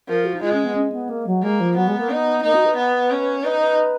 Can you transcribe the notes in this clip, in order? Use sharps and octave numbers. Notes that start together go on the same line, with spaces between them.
F3 A#4
F#4
D#4
G#3 F4
C#4
B3
C#4
B3
A#3
F#3
G#3 A#3
F3
F#3 B3
G#3
A#3
B3 D#4
A#3 D#4
F#4
B4
B3
C#4
D#4 B4
B4